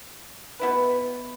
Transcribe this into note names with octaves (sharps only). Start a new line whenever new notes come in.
B2 B3 E4 B4